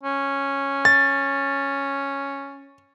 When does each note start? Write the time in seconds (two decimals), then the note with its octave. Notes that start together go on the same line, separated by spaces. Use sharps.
0.03 C#4
0.85 A6